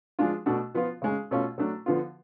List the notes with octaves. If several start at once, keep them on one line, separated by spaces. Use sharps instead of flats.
F3 G#3 D4 F4
B2 A3 D4 F#4
F3 B3 F4
C#3 G#3 C#4
B2 A3 C#4 F4
F#3 A3 D4
D3 F3 B3 F4